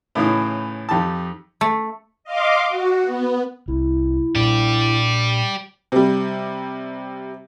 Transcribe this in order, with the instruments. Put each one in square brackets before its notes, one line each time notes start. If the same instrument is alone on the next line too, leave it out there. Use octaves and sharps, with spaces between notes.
[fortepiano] A2 C#3 E3 C#4 D#4 D#6
F2 D#4 G4 A5
[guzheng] A3
[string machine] D#5 F5 C6 D6
F#4
B3
[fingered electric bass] C2 [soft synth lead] E4
[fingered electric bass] A#2 D4 [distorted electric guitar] G4 D5
[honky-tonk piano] C3 G3